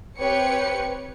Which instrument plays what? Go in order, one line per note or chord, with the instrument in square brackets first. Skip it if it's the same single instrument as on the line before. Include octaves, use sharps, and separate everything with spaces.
[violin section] C4 G4 B4 C#5 C#7